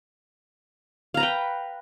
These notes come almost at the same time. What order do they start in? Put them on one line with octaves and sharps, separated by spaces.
F5 A#5 B4 G5